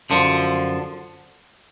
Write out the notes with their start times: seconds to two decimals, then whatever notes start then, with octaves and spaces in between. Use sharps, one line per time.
0.10 F#2 D3 F3